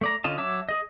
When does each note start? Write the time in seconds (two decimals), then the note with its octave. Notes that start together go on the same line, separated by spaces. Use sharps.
0.01 A3 D5 A#5
0.24 D3 C#4 F4 D#5 A5
0.38 F#3 C#5 E5 A5 D6
0.69 G#4 D#5